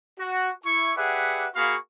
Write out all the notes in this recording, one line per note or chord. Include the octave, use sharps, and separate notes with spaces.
F#4
E4 C#6
G4 G#4 B4 D5 E5 F#5
A#3 F#4 G#4 F5 B5 C#6